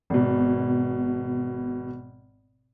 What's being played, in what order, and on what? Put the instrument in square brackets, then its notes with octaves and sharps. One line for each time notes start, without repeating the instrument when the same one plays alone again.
[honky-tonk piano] G#1 B2